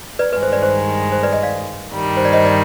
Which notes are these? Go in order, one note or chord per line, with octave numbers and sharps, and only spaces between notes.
B4 D5
G2 D#3 G#3 B4
C5
B4 D5
C5
C5
B4 D5
D#5 G5
D5 F5
G2 D#3 G3
C5
D5
C5 D#5
D5